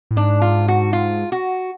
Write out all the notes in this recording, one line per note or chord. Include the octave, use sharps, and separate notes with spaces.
A2
G#2 D4
F4
F#4
F4
F#4